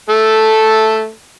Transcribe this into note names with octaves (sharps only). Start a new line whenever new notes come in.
A3 A4